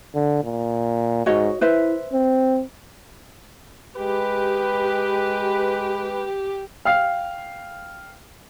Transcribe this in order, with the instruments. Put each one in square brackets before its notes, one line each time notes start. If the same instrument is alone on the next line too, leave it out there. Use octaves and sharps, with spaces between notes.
[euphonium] D3
A#2
[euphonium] G#2 [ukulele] F#4 C#5 D#5
[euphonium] E4 [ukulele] B4 C5 E5
[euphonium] C4
[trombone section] G#3 B4 [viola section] G4
[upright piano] F5 G5 F6 C7